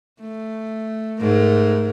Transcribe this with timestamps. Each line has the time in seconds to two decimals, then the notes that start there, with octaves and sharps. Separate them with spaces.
0.20 A3
1.20 G#2 A3 A#4